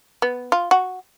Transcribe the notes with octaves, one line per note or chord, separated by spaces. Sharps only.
B3
F4
F#4